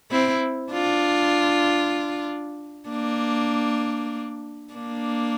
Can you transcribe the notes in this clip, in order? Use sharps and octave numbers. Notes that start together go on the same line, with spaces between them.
C4 E4
D4 F4
A#3 D4
A#3 D4